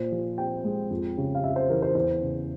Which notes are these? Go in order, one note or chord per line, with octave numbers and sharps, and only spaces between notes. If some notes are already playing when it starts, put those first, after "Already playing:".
Already playing: A#2 C5
F3
C4 G5
G#3
F2
C#3
F5
F2 E5
C5
E3 A#4
C5
E2 C5
C#3